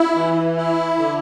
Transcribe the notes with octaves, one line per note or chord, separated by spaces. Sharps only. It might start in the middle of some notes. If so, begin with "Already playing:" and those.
Already playing: E4
E3
E4
D3